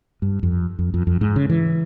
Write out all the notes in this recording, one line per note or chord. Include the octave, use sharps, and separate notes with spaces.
G2
F2
F2
F2
F2
G#2
C#3
E3